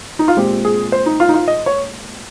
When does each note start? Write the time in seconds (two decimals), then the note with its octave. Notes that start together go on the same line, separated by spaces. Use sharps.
0.19 D#4
0.28 F4
0.37 A#2 G#3 C4 G4
0.65 G#4
0.92 C5
1.06 D#4
1.20 F4
1.29 D#4
1.34 F4
1.48 D#5
1.66 C#5